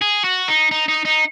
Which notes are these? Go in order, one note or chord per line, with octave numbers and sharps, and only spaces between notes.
G#4
F#4
D#4
D#4
D#4
D#4